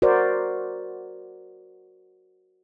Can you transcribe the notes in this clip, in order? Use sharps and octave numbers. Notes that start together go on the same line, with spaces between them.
F#4 A#4 C5 D5